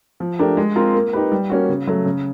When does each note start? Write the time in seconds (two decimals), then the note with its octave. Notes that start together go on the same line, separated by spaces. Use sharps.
0.20 F3
0.39 A3 D4 G4 A#4
0.57 G#3
0.76 C4 F4 A#4
0.94 A#3
1.13 D#4 G4 B4
1.32 G3
1.50 A#3 C#4 F#4
1.69 C#3
1.87 F#3 A3
2.05 C#3